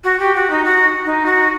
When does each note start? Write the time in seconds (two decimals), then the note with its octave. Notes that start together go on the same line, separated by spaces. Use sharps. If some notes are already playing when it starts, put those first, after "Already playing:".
0.03 F#4
0.19 G4
0.35 F#4
0.50 D#4
0.64 F#4
1.05 D#4
1.25 F#4